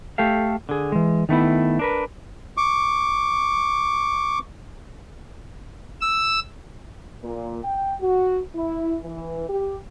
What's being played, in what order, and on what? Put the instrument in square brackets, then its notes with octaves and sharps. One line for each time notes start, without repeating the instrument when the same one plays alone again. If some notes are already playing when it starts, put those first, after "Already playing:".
[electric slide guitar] A3 G4 A4 F5
D3 G#4
E3 G#3
D#3 A3 B3 E4
D4 A#4 B4
[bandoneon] C#6 D6
[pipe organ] E6
[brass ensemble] A#2
G5
F#4
E4
E3
G4